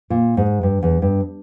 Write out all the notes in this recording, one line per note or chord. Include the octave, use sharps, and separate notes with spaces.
A#2
G#2
G2
E2
G2